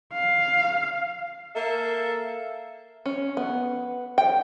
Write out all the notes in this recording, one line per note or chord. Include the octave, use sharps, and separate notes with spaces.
F5
A#3 A4 E5
C#4
B3
G5